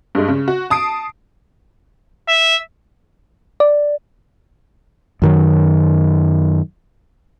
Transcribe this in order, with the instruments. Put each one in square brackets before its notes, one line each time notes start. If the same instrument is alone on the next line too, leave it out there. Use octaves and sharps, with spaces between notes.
[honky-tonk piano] G2 G#3
C#3
F#4
A5 D#6 C7 D7
[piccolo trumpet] E5
[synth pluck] D5
[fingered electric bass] F#2 D#3 F#3